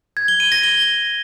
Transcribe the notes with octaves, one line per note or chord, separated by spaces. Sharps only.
G#6
G7
D#7
A#6
G7